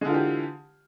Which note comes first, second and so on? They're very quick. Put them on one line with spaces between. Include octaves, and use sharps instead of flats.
G#3 D3 F4 E3 G4